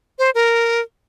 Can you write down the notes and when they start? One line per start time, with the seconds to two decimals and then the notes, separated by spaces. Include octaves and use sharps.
0.19 C5
0.35 A#4